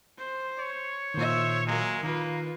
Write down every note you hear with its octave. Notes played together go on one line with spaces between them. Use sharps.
C5
C#5
A#2 D#3 C5 E5
F#3 G#3 A#3
D#3 A#3 F4 B4